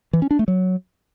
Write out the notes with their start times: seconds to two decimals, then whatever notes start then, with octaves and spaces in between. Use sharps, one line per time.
0.13 E3
0.22 C#4
0.31 D4
0.39 A3
0.48 F#3